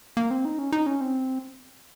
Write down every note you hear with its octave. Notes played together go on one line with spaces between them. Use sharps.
A#3
C4
D#4
C#4
D#4
C#4
C4